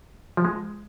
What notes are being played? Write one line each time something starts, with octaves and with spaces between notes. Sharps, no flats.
F3
G#3